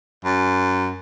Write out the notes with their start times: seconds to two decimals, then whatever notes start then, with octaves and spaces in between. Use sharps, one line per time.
0.25 F#2